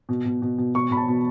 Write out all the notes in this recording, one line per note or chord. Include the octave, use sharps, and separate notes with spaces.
B2
B2
B2
B2
B2 C#6
B2 B5
A5
B2